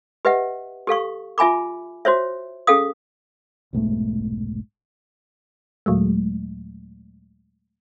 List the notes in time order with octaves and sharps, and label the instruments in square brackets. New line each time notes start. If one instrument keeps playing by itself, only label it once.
[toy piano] G4 B4 D#5 E5 F#5
G4 A4 F5 C#6
F4 E5 G#5 B5 D6
F#4 C5 C#5 E5
C#4 G#4 A4 F5 D#6
[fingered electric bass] F1 B1 G#2 A3
[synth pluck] D#2 A#2 F#3 G#3 A3